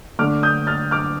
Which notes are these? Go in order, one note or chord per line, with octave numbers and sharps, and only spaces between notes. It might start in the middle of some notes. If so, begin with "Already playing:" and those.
D3 A3 D4 D6 F6
D#6 G6
F6 A6
D6 F6